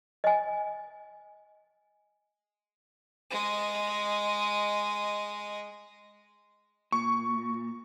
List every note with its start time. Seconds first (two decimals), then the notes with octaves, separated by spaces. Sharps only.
0.24 D#5 G#5
3.30 G#3 D#5
6.92 A#2 C#6